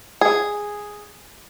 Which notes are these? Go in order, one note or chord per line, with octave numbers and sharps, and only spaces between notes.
G#4